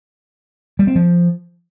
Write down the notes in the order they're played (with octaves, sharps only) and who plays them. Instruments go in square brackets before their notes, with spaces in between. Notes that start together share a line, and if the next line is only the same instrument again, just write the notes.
[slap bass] G3
C4
F3